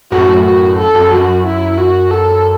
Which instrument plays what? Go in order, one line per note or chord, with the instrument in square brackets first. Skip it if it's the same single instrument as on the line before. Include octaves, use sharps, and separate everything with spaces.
[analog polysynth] F#2 A2 [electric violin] F#4
[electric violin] F#4
A4
[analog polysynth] F#2
[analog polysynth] F#2 [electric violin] F#4
[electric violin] E4
F#4
A4